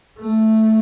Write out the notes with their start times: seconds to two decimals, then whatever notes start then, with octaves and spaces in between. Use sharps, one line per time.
0.19 A3